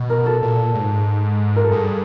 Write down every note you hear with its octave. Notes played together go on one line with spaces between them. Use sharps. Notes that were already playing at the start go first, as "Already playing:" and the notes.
Already playing: B2
A#4
A4
A#2
G#2
A#4
A4
G2 G#4